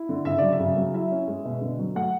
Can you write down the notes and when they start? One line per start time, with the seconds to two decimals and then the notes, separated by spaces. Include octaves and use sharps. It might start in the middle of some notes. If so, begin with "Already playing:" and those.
Already playing: E4
0.09 D3
0.25 C#3 E5
0.38 F#3 D5
0.52 E5
0.60 C#3
0.77 F#3
0.94 E4 E5
1.11 C#4
1.28 G#3
1.45 B2
1.61 D3
1.79 F#3
1.95 A3 F#5